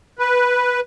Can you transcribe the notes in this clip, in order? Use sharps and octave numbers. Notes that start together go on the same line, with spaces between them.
B4